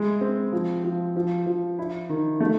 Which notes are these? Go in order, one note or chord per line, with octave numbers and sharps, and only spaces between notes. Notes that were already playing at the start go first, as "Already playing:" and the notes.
Already playing: G#3 E4
C4
F3
F3
F3
F3
E4
D#3
A3